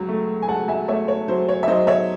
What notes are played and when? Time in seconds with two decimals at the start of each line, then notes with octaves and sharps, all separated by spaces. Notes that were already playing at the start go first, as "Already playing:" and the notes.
Already playing: C#2 F#3
0.09 A3
0.42 G#5
0.48 C#2 F#5 A5
0.68 E5 G#5
0.88 A3 C#5 E5
1.08 C#5
1.28 F#3 C5
1.49 C#5
1.63 E5
1.68 F#3 C5 D#5
1.87 C#5 E5